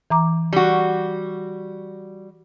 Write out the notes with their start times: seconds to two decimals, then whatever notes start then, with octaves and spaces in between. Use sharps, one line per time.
0.10 E3 A#5 D6
0.53 G3 F#4